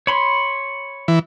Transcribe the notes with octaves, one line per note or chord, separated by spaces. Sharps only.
C#5 B5 C6
E3